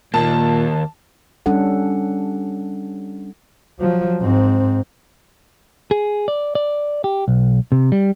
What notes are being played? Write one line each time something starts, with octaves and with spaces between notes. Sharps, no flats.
D#2 A#2 A#3 A5
G3 C#4 D4 A4 F#5
F3 F#3
G#2 C4
G#4
D5
D5
G4
B1
C3
G3